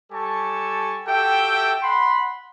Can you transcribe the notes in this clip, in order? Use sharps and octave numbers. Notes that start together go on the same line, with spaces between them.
G3 G4 A4 G#5 A5 C#6
F#4 G4 A4 E5 G5
F#5 B5 C6